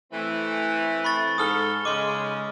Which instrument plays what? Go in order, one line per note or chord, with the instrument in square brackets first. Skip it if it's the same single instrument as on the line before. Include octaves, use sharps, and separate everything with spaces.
[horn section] E3 A3 C4
[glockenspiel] B5 C#6 A6
[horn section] G#2 A4 [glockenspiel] D#6 F6 G7
[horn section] C#3 G#3 [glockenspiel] C6 D6